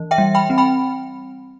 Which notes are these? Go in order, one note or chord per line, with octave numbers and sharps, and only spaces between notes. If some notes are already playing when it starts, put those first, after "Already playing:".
Already playing: E3
E5 G5
G3
G5 B5
C4
G5 B5